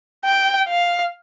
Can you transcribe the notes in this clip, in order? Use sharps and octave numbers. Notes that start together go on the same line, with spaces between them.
G5
F5